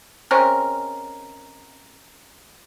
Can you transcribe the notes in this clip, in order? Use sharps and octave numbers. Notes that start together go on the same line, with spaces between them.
G#3 C4 C#4 A#4